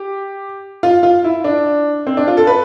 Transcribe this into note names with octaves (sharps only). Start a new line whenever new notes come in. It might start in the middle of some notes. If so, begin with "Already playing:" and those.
Already playing: G4
F4
F4
E4
D4
C4
D4
F4
A4
B4